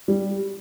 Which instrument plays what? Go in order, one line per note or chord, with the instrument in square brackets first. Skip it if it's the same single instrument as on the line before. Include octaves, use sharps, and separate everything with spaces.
[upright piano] G3